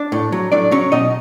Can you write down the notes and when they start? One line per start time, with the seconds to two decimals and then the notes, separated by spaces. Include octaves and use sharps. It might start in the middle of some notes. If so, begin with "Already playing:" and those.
Already playing: D4 D5
0.12 A2
0.32 F#3
0.52 A2 D4 D5
0.72 F#3 C#4 C#5
0.92 B2 D#4 D#5